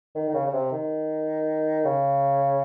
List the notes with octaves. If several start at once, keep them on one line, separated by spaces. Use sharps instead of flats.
D#3
D#3
C#3
C#3
C3
D#3
C#3